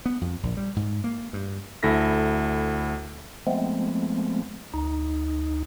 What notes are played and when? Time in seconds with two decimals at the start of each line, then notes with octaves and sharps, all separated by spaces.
0.06 B3
0.21 F2
0.43 A#1
0.57 G3
0.76 G#2
1.04 A#3
1.33 G2
1.83 D2 E4 A4 A#6 B6
3.47 F3 G#3 A3 B3 C4
4.74 D2 D#4